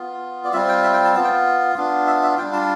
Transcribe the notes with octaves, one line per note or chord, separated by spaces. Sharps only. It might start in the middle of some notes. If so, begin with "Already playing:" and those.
Already playing: B3 F4
D5
G3 C4 F4 E5
G5
E5
G5
A5
B3 F4 A5
G5
B3 D4 F4
E5
E5
G3 D4 F4 G5
A5